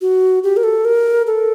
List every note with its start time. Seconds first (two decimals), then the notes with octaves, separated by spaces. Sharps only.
0.01 F#4
0.44 G4
0.57 A#4
0.64 A4
0.85 A#4
1.27 A4